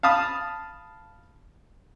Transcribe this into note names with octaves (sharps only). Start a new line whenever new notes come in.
F5 A5 B5 D#6